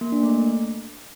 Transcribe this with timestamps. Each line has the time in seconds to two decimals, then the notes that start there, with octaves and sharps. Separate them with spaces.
0.01 A#3
0.12 D4
0.23 A3